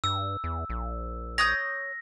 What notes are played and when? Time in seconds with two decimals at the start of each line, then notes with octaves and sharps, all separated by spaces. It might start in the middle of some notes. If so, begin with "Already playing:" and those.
0.04 G2 E6
0.44 E2
0.70 A#1
1.38 C#5 D#6 G6 A#6